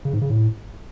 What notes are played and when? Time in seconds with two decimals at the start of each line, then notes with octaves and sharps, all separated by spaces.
0.05 C#3
0.13 G#2
0.22 C#3
0.30 A2